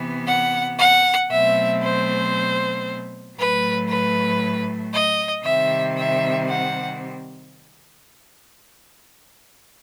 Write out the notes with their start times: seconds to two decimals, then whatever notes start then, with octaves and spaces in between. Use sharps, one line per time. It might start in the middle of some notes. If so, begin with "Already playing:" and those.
Already playing: C3 E3 B3
0.26 F#5
0.78 F#5
1.30 B2 F#3 A3 C4 E5
1.82 C5
3.37 A2 F#3 A3 B4
3.88 B4
4.92 D#5
5.43 C3 D#3 G3 C4 E5
5.96 E5
6.48 F#5